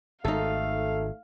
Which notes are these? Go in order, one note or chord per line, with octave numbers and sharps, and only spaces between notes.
G#1 A3 D#4 A4 F5